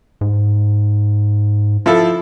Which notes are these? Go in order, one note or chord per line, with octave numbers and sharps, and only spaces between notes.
G#2
F3 E4 A4